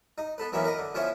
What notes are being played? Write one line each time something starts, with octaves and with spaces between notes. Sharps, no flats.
D#4
B3 A4 B4
E3 F#3 A#3 B3 C#4 E4
A#4 B4 D#5
D3
F3 B3 C#4 E4 C5 C#5